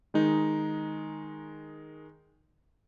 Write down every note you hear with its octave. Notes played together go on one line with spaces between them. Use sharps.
D#3 G#3 D#4